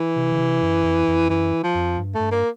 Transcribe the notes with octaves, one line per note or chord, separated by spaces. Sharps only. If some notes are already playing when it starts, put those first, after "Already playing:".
Already playing: E3
C3
C#3
C3
F#2
F2
F2
F#2 E3
F3
F2
G2
A3
G2
A#3